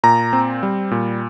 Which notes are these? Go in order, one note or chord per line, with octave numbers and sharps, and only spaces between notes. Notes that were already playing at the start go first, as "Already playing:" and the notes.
A#2 A#5
C4
G3
A#2